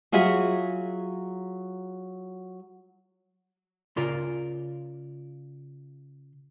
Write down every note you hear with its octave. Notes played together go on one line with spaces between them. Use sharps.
F#3 F4 F#4 G#4 E5
C#3 F4 A#4 D5 C6